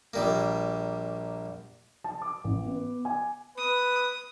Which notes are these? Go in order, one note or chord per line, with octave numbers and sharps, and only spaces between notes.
A#1 G3 A#3
A5
D6
A1
B3
G#5
B4 D#6